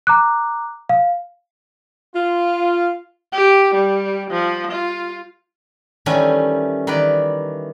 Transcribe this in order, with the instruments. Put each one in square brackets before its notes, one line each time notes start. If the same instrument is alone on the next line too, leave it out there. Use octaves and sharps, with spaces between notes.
[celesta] A#5 D6 F#6
F5
[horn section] F4
[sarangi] G4
G3
F3
F4
[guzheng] D#3 E3 G3 A3 C#4
D#3 E3 B4 D5